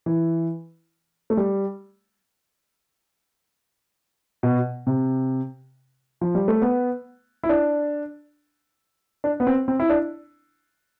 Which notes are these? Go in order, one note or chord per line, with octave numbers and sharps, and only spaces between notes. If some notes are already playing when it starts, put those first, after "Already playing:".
E3
A3
G3
B2
C3
F3
G3
A3
B3
E4
D4
D4
B3
C4
C4
E4
D4